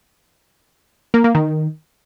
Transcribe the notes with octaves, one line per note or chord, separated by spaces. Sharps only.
A#3
A#3
D#3